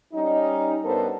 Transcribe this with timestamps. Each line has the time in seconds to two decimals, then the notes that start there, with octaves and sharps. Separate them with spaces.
0.13 G3 C#4 D#4
0.84 G2 B3 A4 A#4 C5